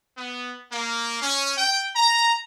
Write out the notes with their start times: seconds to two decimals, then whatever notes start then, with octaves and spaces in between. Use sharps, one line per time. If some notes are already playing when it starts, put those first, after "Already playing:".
0.18 B3
0.72 A#3
1.22 C#4
1.58 G5
1.96 A#5